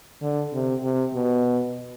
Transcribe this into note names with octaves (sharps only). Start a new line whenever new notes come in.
D3
C3
C3
B2